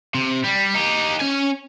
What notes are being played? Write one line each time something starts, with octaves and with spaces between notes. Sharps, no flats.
C3
G3
D#4 G4
C#4 G#5